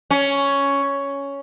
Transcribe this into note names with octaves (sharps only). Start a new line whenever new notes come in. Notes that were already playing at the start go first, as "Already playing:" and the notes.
C#4